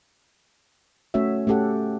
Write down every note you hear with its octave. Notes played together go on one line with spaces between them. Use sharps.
A3 C#4 F#4 C#5 E5
A3 C#4 G4 A4 F#5